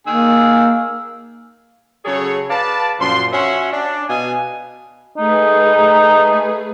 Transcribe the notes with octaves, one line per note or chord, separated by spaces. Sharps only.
D#3 A#3 G#4 E6
C#3 F#3 G#4 A4 C#5
B4 D5 F5 A5
F#2 A#2 F3 C6
C#4 F#4 C#5 E5 F#5 C6
D4
B2 D#5 F5 G#5
A3 D#4 G#4 B4